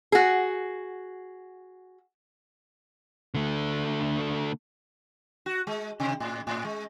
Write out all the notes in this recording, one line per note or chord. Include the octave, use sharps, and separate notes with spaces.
F#4 G#4
D3 A3
F#4
G#3
C3
A2
A2
G#3